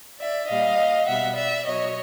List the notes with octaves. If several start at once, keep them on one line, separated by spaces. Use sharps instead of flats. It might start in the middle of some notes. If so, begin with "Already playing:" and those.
D5 E5
A#2 G3 D#5 F5
B2 G3 E5 F#5
D5 E5
B2 F#3 C#5 D#5